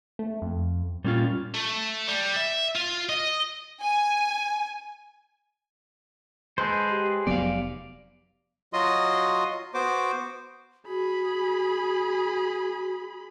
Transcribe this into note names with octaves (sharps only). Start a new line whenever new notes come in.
A3
F2
A#2 G3 C#4 F4
A3
G3
E5
F4
D#5
G#5
G#3 G#4 A4 B4 C5
G4
F1 F#3 B3 D5 F5
F#3 F4 F#4 D#5 C6 D#6
B3 F#4 C5 D6
F#4 G#4 B5